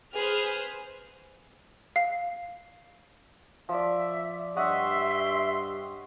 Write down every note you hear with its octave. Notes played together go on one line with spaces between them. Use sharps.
G#4 B4 C5 F6
F5
F3 D5 E5
G2 G4 C#5 D#5 E5 F#5 C6